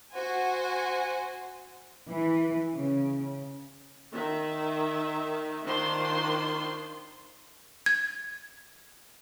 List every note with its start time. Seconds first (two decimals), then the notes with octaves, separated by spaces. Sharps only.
0.15 F#4 C5 G#5
2.08 E3
2.74 C#3
4.13 D#3 E5
5.64 D#3 D4 F4 C5 C6
7.86 G#6